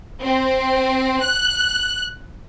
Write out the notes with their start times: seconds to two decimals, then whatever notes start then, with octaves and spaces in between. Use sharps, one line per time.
0.22 C4
1.23 F#6